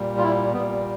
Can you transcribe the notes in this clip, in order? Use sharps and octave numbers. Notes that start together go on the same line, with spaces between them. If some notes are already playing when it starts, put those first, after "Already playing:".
Already playing: A#2 G3
F4
E4
A#2 G3 B3